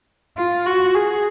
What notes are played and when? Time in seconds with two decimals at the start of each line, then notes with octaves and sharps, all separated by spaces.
0.37 F4
0.66 F#4
0.95 G#4